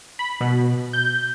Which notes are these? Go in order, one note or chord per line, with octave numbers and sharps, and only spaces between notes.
B5
B2
G6